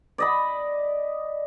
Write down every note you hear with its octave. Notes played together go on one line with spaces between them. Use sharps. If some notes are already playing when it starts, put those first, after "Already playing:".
D5 D#5 B5